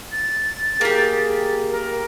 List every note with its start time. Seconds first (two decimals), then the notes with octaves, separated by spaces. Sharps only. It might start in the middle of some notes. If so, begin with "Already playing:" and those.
0.12 A6
0.81 A#3 G4 G#4
1.71 A#4